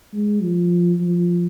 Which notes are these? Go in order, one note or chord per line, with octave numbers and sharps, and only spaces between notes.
G#3
F3
F3